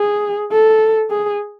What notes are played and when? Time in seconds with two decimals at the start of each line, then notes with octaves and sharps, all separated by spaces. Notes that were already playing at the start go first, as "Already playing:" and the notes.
Already playing: G#4
0.52 A4
1.10 G#4